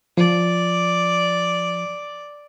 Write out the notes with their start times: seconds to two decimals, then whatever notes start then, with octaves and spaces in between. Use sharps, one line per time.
0.17 F3 D5